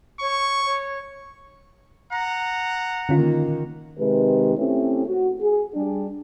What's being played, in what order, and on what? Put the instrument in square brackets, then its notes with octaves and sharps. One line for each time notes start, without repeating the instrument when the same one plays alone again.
[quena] C#5 [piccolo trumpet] C#6
[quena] C#5
[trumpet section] F#5 A#5
[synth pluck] D3 C#4 F4 [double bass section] D#3 A#3
[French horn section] C3 D#3 G#3 G4 B4
A3 C4 C#4 E4 G4
F#4
G#4
G3 D4 G#4